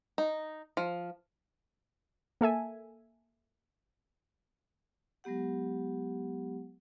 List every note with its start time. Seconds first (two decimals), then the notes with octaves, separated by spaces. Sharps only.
0.18 D#4
0.77 F3
2.41 A#3 A4 E5 G#5
5.24 F#3 G#3 B3 G4 F#5